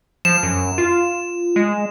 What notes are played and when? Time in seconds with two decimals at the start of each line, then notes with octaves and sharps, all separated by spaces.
0.25 F3 E7
0.43 F#2
0.78 F4
1.56 G#3